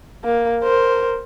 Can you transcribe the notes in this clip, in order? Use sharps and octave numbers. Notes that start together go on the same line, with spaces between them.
A#3
A#4 C5